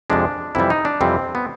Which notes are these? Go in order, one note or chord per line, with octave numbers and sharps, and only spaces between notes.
F2 C3 F3 G#3 D4
F2 C3 E3 G3 E4
D#4
D4
F2 C3 E3 G3 C4
B3